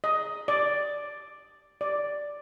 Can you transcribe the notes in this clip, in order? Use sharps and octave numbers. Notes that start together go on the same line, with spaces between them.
D#5
D5
D5